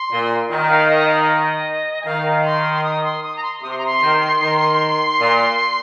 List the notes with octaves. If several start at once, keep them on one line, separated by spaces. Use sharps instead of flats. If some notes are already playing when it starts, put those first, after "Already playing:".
Already playing: C6
A#2
D#3
F5
D#5
F5
D#5
G#5
D#3 F5
C6
D#6
C6
D#6
A#5
C6
C3 D#6
C6
A#5
C6
D#3
D#3
A#2